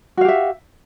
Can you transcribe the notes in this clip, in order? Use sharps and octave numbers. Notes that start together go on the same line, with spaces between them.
F#4 G4 E5 F5